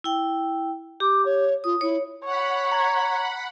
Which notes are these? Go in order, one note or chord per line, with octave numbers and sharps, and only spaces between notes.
E4 G5
G4 D6
C#5
F4 D#6
E4 C#5
C#5 F#5 B5
A#5 G#6